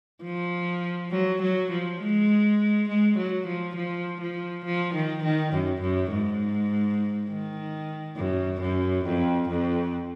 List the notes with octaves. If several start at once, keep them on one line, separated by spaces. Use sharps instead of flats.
F3
F#3
F#3
F3
G#3
G#3
F#3
F3
F3
F3
F3
D#3
D#3
F#2
F#2
G#2
D#3
F#2
F#2
F2
F2